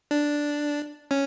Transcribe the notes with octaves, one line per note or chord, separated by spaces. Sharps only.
D4
C#4